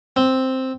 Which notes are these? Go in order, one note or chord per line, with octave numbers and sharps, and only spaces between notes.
C4